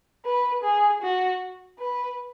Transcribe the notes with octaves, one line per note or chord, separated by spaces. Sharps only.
B4
G#4
F#4
B4